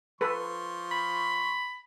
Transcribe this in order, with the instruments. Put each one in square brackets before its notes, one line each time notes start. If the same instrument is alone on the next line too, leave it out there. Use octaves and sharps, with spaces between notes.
[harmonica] F3 C6 C#6 [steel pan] A4 B4
[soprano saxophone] B5